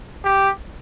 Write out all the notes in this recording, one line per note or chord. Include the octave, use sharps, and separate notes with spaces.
G4